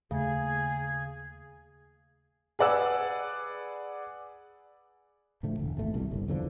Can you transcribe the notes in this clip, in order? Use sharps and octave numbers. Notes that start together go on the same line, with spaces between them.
D#2 C#3 A3 G#4
G#4 B4 D5 F#5 E6
A2 D3 F3 A3
E1
G#1 D#2 A3
C2 G2 B2
G1 C2
E2 D3 F3